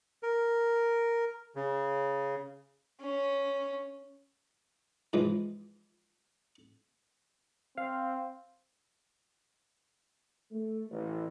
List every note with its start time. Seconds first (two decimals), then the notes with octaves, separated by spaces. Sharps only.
0.23 A#4
1.55 C#3
3.01 C#4
5.13 G#2 E3 F3 G#3
7.78 C4 F5
10.52 A3
10.91 A1